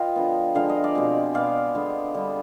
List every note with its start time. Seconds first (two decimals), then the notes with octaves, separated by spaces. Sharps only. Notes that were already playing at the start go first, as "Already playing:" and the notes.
Already playing: F4 B4 D#5 F5 G5
0.16 D3 F3 B3
0.55 D3 F3 G#3 F5
0.70 D#5
0.84 D5 F5
0.95 B2 G#3 C4
1.34 B2 B3 D5 F5
1.75 D3 G#3 B3
2.14 D3 G3 B3